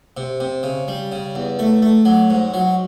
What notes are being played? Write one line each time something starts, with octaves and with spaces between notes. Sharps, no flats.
C3
C3
C#3
G3
C#3
E2
A3
A3
F#3
G#2
F#3